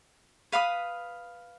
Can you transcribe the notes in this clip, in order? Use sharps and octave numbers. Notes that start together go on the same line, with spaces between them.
B4 F5 B5 D#6